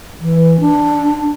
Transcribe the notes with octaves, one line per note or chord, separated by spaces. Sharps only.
E3
D4